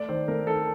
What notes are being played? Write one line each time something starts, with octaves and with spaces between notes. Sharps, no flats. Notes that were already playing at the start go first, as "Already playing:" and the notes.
Already playing: A3 D5
D#3 C5
A3 A#4
D#3 A4